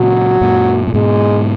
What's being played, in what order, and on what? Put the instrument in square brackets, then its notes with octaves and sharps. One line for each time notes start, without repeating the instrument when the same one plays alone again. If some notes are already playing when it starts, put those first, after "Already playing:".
Already playing: [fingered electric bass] A#2 C#3 [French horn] F#3
[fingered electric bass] F#2 A#2
A#2
[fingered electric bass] G#2 B2 [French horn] G#3